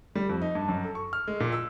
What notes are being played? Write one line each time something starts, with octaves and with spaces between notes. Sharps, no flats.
G3
F2
D#4
G2
F#2
A4
C#6
F6
G#3
A#2
E6